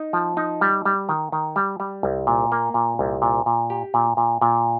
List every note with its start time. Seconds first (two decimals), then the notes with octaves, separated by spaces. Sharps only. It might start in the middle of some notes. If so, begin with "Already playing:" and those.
Already playing: D#4
0.13 F3
0.37 D#4
0.61 G3
0.85 G3
1.09 D#3
1.32 D#3
1.56 G3
1.80 G3
2.03 C2
2.27 A#2
2.52 A#3
2.74 A#2
2.99 C2
3.22 A#2
3.46 A#2
3.70 G4
3.94 A#2
4.17 A#2
4.41 A#2